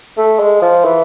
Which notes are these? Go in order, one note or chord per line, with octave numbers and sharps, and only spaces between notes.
A3
G#3
F3
E3